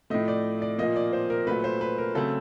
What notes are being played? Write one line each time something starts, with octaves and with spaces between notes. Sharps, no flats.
A2 F3 A3 D#5
D5
D5
A#2 F3 A#3 D#5
D5
C5
A#4
A#2 F#3 A3 B4
C5
B4
A#4
C#3 F#3 A3 C4 A4